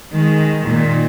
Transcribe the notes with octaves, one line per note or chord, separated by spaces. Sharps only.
D#3 G#3
A#2 D#3